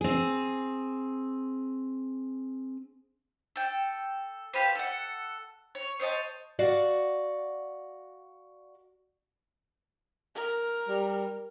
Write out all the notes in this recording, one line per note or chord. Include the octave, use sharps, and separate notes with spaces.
C4 G#4
A4 G5
F4 G4 B4 C5
A4 F#5
C#5
C5 C#5 D#5 A5
F#4 D5 F5 F#5
A#4
G3